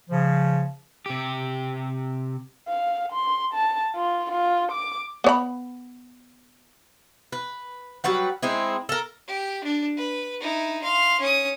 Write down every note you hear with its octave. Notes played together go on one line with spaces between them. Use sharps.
C#3 F3
C3 G4
F5
C6
A5
F4
F4
D6
B3 C#5 B5
B4
F#3 G3 B4 F#5
G#3 C4 D#4 E4
A4 A#4
G4
D4
B4
D#4 E4
F5 C6
C#4 D#6